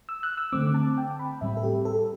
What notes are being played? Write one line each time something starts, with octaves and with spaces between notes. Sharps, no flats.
E6
F#6
E6
D3 A3 C4 D6
A5
G5
B5
A2 G3 C4 E5
A4
G4
A4